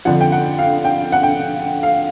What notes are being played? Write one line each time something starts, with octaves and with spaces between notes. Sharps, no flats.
F2 D3 F3 F#5
G5
F#5
F5
G5
F#5
G5
F5